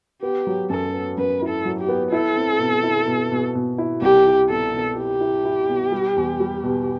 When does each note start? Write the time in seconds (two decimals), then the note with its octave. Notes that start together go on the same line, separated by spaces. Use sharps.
0.22 B3 G4
0.47 F#3
0.70 F#2 A4
0.94 B3
1.18 F#2 B4
1.42 E4
1.49 A4
1.65 F#3
1.80 G4
1.89 B3
2.12 E4 A4
2.36 C4
2.60 B2
2.83 E4
3.07 B2
3.32 B2
3.55 B2
3.78 E4
4.02 C2 G4
4.26 E4
4.50 B2 A4
4.73 B2
4.97 E4 G4
5.21 E4
5.45 E4
5.68 B2
5.92 G3
6.16 E2
6.40 G3
6.63 B2